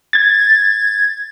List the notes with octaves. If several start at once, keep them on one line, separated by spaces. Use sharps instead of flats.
G#6 A6